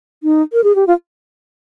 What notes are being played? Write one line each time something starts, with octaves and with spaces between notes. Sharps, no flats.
D#4
A#4
G#4
G4
F4